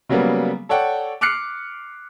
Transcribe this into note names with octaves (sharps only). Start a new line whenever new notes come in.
C#3 F#3 G3 A#3 B3
A4 C#5 D5 F#5 G5
D6 F6 F#6 C7 C#7